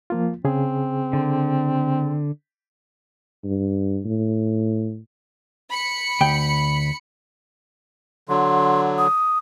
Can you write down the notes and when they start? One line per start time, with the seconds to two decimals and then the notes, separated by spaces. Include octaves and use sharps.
0.10 F3 A#3 F4
0.45 C#3 C4 G#4
1.13 D3
3.44 G2
4.05 A2
5.70 B5 C#7
6.21 D2 G5
8.29 D3 F#3 C6
8.98 D#6